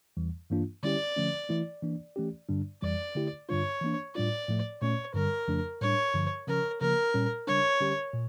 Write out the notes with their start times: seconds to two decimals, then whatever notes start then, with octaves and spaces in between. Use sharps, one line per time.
0.17 E2 E3 G3
0.50 G2 E3 A#3 D4 F4
0.83 D3 G3 C#4 E4 G4 D5
1.16 D3 F3 A3 C#4
1.49 E3 A3 E4
1.83 E3 A#3 D4
2.16 E3 A3 C#4 G4
2.49 G2 D3 G3 D4
2.82 F2 E3 G3 D5
3.15 D3 A3 E4 G4
3.49 G2 D3 G3 D4 F4 C#5
3.81 E3 A#3 D4
4.15 A2 G3 D4 F4 D5
4.48 A2 F3 A3
4.82 A#2 A3 C#4 C#5
5.14 G2 D3 G3 A#4
5.48 F2 C#3 F3 A3 D4
5.81 A2 G3 D4 C#5
6.14 G2 D3 F3
6.47 C#3 F3 C#4 A#4
6.81 C#3 F3 A#3 A#4
7.14 A#2 G3 C#4
7.47 C#3 G3 D4 C#5
7.80 D3 G3 C#4 G4
8.13 A#2